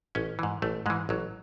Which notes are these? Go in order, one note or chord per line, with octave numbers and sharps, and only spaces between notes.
A1 C#4
G#2 E3
A1 A3
G#2 E3 G#3
A1 F#3